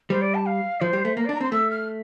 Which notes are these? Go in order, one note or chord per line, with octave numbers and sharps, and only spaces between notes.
G3 C5
D5
A5
F5
F3 C5
G3
A3
A#3 A#4
D5
D4
A#5
C4 C6
A3 E6
F6